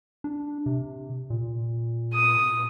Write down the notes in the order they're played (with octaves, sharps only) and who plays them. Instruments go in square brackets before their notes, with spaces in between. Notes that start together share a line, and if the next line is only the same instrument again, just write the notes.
[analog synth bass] D4
C3
A#2
[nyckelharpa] D#6